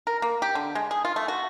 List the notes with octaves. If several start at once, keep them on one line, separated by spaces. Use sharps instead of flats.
A#4
A#3
G4
D3
G#3
G#4
F4
A3
F#4